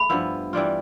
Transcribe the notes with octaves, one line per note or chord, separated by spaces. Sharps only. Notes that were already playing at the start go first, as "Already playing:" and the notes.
Already playing: A3 B5
G2 F3 B3 E4
E3 G3 D4 F4